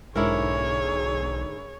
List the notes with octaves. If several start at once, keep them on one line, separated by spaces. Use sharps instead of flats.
B1 G#2 D3 D4 E4 G#4 A#4 C#5